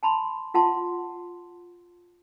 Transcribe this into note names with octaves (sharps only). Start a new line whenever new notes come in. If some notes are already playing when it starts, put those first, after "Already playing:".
G#5 A5 B5 C6
F4 F#5 A5 C6